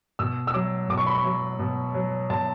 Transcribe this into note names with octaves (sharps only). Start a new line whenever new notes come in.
B2 E6
E6
F#3 D6
B2 D6
C#6
B5
C#6
F#3
B2
F#3
B2 A5